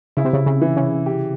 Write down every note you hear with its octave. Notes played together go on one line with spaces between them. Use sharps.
C#3 E4
C3
C#3
C#3
E3
C#3
G4